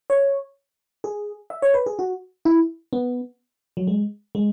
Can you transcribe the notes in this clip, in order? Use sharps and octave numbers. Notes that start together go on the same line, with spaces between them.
C#5
G#4
E5
C#5
B4
G#4
F#4
E4
B3
F#3
G#3
G#3